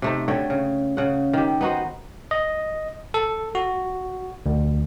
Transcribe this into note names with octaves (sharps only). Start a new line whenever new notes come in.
C3 A3 D#4
D3 A3 C#5 G5
C#3
C#3 F#5
D#3 G4
B3 D#4 F#4 C5
D#5
A4
F#4
D2